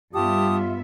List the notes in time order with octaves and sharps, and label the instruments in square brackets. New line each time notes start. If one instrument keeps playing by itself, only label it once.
[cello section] G2 B3 E5 [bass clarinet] F4 [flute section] G4 A5 D#6